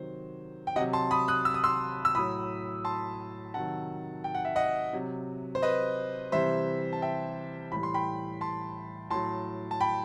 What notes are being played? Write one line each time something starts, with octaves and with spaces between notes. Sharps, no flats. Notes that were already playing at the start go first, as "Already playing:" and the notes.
Already playing: C3 D#3 F#3 C5
G5
C3 F#3 D#5 F#5
A5 C6
B5 D#6
D#6 F#6
E6
D#6
C6 E6
E6
A2 F#3 B5 D#6
A5 C6
C3 D#3 F#3 F#5 A5
G5
F#5
E5
D#5 F#5
C3 F#3
C5
B4 D#5
C3 E3 G3 C5 E5
A5
E5 G5
A2 E3 G3 B5
C6
G5 B5
A5 C6
A2 F#3 A5 C6
A5
G5 B5